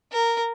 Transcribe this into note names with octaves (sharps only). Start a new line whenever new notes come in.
A#4